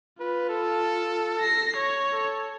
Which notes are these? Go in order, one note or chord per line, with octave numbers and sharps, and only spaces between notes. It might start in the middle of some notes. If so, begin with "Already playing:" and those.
F4 B4
A4
A#6 C7
C#5
A4